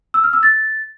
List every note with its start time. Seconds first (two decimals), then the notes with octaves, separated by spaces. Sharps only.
0.14 E6
0.24 F6
0.33 E6
0.43 A6